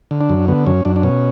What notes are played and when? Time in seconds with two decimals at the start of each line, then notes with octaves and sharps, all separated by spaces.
0.11 D3
0.21 D4
0.30 F#2
0.48 D3 B3
0.66 F#2 C#4
0.85 F#2 D4
0.96 D4
1.03 B2 C#4